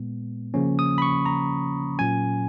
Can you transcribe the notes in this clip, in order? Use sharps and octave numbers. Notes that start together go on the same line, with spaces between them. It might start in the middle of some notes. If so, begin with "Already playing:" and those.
Already playing: A#2 G#3 B3
C#3 F3 A#3 C#4
D#6
B5
C#6
A#5
A#2 F#3 C#4 G#5